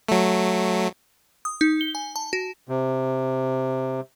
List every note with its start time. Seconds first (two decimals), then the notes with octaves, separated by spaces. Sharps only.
0.09 F#3 A3
1.45 D#6
1.61 D#4
1.81 G7
1.95 G#5
2.16 A5
2.33 F#4
2.69 C3